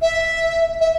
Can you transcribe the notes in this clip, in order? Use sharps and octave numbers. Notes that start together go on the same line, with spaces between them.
E5
E5